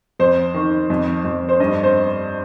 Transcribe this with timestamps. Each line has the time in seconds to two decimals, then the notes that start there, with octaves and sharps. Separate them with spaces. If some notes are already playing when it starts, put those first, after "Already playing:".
0.19 F2 C5
0.54 D#3
0.90 F2
1.25 F2
1.49 C5
1.60 G2 D#5
1.84 C5